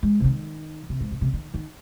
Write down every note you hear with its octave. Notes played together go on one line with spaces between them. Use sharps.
G#3
C3
D#3
C3
G#2
C3
C3
D#3
D#3